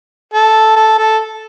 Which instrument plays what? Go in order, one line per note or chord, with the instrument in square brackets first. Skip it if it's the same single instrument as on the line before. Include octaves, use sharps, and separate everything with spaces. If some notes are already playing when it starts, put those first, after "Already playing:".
[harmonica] A4
A4
A4